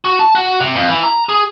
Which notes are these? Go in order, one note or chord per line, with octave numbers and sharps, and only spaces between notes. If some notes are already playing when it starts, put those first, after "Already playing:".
F#4
A5
F#4
C3
F2
E3
A#5
G#4